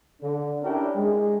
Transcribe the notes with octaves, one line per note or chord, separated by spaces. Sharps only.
D3
C#4 D4 E4 G4 A#4 G5
G#3